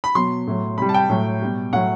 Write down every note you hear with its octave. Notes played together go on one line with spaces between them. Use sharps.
B5
B2 F#3 C6
A2 F#3
C3 G3 B5
A5
G5
A2 F#3
B2 G3
A2 F#3 F#5